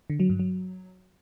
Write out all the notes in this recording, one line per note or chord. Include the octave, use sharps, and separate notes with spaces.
D3
F#3
G2
F#3